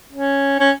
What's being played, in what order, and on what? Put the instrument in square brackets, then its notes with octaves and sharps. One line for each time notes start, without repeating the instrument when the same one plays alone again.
[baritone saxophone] C#4
C#4